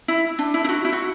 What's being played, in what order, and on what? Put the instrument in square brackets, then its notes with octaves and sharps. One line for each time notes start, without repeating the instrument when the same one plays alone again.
[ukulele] E4
D4
E4
E4
F#4
E4
F#4